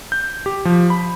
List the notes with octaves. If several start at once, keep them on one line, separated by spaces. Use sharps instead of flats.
G6
G4
F3
B5